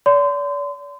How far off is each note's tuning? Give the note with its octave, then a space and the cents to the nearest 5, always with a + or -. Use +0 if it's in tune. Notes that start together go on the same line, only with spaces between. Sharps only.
D5 -40 C6 -35